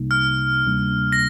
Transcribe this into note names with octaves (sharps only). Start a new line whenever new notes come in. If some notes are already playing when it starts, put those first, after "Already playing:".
Already playing: C2 C3 G3 A#3 D#4
F6
D2 C3 G3 A#3 D4
A#6